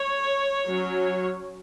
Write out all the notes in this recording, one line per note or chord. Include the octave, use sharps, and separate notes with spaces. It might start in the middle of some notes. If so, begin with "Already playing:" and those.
Already playing: C#5
F#3 C#4